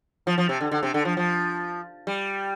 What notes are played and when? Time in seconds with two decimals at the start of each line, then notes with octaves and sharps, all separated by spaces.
0.27 F3
0.38 F3
0.49 C3
0.61 D3
0.72 D3
0.83 C3
0.94 D3
1.05 F3
1.17 F3
2.07 G3